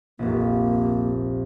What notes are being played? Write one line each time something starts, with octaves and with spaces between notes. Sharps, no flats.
F1 A#1 A#3